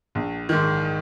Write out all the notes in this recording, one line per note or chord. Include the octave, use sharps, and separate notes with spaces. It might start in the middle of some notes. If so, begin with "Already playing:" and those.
A#1
G#2 D#3